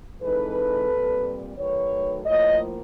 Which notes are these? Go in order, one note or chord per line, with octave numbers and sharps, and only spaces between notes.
E3 G#3 C4 D#4 A4 B4
A#2 G3 C4
D#3 F#3 A3 B4 C#5
A2 F3 A#3 C#5 D#5